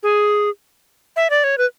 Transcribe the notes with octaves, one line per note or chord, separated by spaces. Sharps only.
G#4
E5
D5
C#5
B4